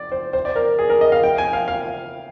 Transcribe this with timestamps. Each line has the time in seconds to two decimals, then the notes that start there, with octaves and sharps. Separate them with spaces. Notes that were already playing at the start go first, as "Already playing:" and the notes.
Already playing: D5
0.12 C5
0.33 C5
0.45 D5
0.56 A#4
0.79 G#4
0.90 A#4
1.01 D#5
1.12 F5
1.23 G5
1.38 G#5
1.53 F5
1.68 F5